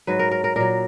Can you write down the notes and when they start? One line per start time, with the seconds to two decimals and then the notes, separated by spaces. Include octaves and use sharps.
0.07 G#2 F#3 B4
0.19 A#4
0.31 A#4
0.44 A#4
0.56 A#2 F#3 A#4